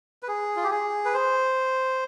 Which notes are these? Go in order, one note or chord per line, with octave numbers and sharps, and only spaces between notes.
B4
G#4
F4
G4
G#4
B4
C5